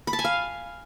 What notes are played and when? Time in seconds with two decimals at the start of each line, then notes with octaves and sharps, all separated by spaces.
0.07 B5
0.13 A5
0.19 G#5
0.25 F5